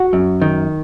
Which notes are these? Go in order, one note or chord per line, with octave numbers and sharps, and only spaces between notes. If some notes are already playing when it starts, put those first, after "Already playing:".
Already playing: F#4 F#5
F#2
D#3